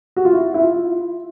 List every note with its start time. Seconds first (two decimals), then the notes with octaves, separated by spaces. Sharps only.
0.16 F#4
0.25 F4
0.33 E4
0.54 E4
0.62 F4